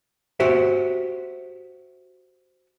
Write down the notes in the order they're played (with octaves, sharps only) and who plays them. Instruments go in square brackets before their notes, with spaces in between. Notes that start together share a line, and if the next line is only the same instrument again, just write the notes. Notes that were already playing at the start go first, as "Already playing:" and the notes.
[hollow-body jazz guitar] F#4 G4 C5 E5